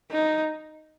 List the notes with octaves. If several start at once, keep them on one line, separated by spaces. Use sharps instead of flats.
D#4